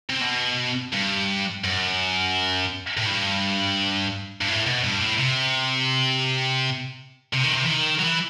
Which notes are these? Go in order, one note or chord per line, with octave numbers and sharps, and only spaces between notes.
C3
B2
G2
F#2
A2
G2
G2
A2
B2
G2
A2
C3
C3
D#3
C3
E3
D#3
F#3
E3